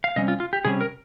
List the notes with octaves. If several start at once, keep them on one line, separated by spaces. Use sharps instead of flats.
F5
C3 G3 C#4 D#5
F4
F4
G4
C3 G3 C#4 G#4
A#4